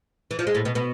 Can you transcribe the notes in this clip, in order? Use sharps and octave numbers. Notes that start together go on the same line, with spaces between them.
E3
F3
G#3
A2 A3
B2 B3
B2 B3